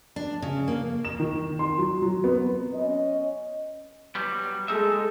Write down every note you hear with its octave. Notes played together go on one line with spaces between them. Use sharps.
D4
C#3
A#3
E7
D#3
C6
F#3
F#3
B3
C#4 D#5
F#3 G3 B3
G#3 D#4 A4 E5